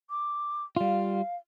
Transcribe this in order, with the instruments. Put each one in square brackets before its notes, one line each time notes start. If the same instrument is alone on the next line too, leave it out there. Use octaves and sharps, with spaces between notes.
[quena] D6
[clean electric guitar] G3 F4 [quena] F5